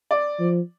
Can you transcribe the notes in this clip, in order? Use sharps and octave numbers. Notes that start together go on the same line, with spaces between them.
D5
F3